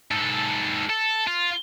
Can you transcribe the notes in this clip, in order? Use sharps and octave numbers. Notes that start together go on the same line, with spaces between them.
G#2 A4
A4
F4